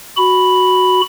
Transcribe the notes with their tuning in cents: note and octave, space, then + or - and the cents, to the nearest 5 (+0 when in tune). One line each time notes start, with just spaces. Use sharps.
F#4 +0 B5 +0